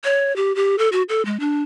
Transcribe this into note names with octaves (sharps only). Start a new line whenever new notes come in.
C#5
G4
G4
A4
F#4
A4
G#3
D4